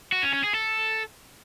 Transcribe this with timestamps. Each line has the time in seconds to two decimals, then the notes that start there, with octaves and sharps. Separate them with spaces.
0.12 F#4
0.23 C#4
0.33 C#4
0.44 G#4
0.54 A4